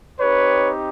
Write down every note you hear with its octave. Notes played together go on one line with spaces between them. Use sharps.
C4 D#4 G4 B4 C#5